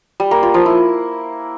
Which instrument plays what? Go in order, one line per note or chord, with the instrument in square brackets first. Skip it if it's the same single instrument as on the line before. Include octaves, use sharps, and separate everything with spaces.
[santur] G3
A#3
F4
F3
E4